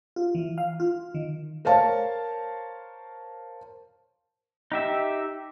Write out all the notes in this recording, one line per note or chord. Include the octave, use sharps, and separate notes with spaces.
F4
E3
F5
F4
D#3
A#4 C5 C#5 F5 A5
D#4 G4 E5